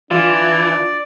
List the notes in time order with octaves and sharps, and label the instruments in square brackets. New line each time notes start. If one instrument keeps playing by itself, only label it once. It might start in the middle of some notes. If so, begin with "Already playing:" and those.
[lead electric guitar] E3 [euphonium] D4 [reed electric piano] F4 [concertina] D5